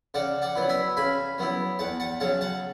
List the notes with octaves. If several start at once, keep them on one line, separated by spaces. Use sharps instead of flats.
C#3 D5 F#5
D5 F#5
F#3 B3 E4
E5 G#5
C#3 G#5 B5
F#3 B3 E4
E2 F#5 A5
F#5 A5
C#3 F#3 F#5 A5
F#5 A5